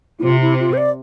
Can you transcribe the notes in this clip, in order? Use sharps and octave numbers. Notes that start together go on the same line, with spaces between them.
E4
C3 F4
E4
F4
C5
D5